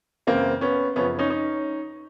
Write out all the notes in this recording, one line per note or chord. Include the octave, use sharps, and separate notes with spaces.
F#2 C#3 E3 A#3 C4
B3 C#4
F#2 C#3 F3 B3 C#4
C#4 D#4
C#4 D#4